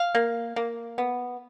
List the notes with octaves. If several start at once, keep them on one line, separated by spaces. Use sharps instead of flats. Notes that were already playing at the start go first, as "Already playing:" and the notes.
Already playing: F5
A#3
A#3
B3